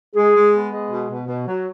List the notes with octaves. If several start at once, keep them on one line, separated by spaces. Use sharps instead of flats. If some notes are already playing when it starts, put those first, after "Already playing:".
G#3 G#4
G#3
B3
G#3
B2
B2
B2
F#3